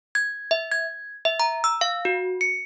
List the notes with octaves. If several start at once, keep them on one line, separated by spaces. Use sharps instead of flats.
G#6
E5
G#6
E5
A#5
E6
F5
F#4
C#7